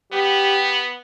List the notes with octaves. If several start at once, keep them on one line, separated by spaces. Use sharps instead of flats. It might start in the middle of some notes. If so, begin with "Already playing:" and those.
B3 G4